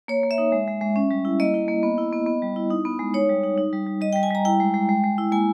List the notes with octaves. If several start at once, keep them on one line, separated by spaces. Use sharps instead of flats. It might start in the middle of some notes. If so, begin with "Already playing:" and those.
A#3 C#5
A#3
E5
D#4
G#3
G#3
G#3
C#4
G3
E4
A#3 D#5
E4
A#3
B3
E4
B3
B3
G3
E4
D#4
B3
G#3
D#4 C#5
G3
D#4
D#4
G3
G3
G3 D#5
G5
G3
G#5
G3 A#5
E4 G5
G#3
G#3
G#3
G#3
E4
A#3 G#5